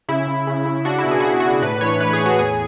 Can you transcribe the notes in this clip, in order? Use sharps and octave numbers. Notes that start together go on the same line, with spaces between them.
C#3 E4
C#3
C#3
C#3
D4 F#4
E4
B2
G#4
B2 F#4
E4
D4 F#4
A2 B4
E3 C#5
A2 B4
G#4
A2
F#4
E2 G#4